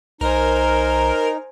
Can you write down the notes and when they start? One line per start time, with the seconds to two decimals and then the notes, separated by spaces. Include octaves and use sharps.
0.21 B1 D#4 A#4 C5 G#5